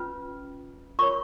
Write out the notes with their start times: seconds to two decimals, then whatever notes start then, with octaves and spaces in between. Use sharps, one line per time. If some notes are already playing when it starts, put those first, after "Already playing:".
Already playing: C#4 F4 B4
0.99 F4 A#4 C#5 C#6